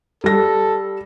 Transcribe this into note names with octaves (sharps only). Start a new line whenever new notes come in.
G3 A4 A#6